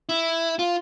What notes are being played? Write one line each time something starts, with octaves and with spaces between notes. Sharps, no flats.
E4
F4